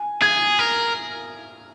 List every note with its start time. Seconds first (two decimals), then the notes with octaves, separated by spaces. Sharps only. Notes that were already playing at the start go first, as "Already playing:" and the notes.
Already playing: G#5
0.22 G#4 G#6
0.59 A#4